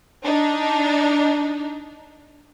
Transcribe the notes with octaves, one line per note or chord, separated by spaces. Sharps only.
D4 D#4